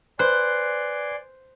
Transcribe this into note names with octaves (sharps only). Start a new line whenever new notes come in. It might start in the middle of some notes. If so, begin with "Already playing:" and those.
B4 C5 D5 G#5 C6 F#6